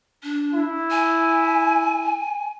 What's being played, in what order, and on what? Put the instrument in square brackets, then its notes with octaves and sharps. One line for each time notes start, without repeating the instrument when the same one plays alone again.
[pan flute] D4
[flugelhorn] E4
[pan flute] G#5